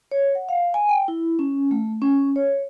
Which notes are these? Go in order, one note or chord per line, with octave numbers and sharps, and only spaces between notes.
C#5
F#5
F5
G#5
G5
E4
C#4
A3
C#4
C#5